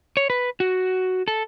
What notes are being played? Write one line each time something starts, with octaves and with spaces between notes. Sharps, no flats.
C#5
B4
F#4
A4